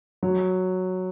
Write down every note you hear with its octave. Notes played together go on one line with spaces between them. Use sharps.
F#3